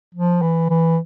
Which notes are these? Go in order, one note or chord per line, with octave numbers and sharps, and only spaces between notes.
F3
E3
E3